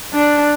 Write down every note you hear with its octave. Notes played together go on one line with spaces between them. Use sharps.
D4